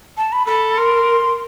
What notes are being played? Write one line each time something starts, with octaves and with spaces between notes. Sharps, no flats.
A5
B5
A4 B5
A#4 C6